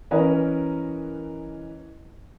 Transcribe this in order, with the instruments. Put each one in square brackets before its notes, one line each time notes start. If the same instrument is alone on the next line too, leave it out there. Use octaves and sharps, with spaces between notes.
[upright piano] E3 C#4 A#4 B4 C#5 D#5